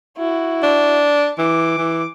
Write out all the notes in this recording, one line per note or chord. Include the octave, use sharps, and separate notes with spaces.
E4 F#4
D4
E3 D6
E3